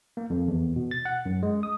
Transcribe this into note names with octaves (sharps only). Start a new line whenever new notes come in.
A#3
F2
E2
B2
A6
F#5
F#2
G#3
D#6